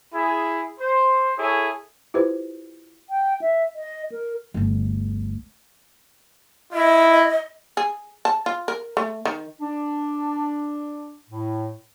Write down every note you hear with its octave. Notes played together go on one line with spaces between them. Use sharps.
E4 G#4
C5
E4 G#4 A4 C#5 G#5
E4 F4 G4 B4 C5
G5
E5
D#5
A#4
G1 D2
E4 D#5
G#4
A5
F4
A#4
A3
D#3
D4
A2